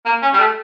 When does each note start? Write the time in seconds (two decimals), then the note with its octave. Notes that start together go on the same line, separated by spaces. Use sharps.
0.05 A#3
0.22 C#4
0.33 G3
0.39 A3